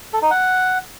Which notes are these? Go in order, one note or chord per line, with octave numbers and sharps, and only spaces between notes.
A4
D#4
F#5